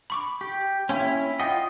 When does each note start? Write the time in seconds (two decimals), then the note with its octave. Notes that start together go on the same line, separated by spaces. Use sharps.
0.10 B5 C#6 D6
0.41 G4
0.89 A#3 C#4 E4 G5 C6
1.40 F4 D#5 F#5 G5